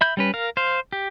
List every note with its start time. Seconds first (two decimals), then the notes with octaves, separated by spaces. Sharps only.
0.01 E5 B5 G6
0.17 G3 C#4 B4
0.34 A#4 F5
0.57 C5 F5
0.92 G4